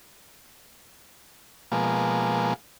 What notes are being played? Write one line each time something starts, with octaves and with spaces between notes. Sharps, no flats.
B2 F3 G#3 A#3